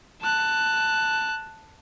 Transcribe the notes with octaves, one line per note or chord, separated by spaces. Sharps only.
A5 F#6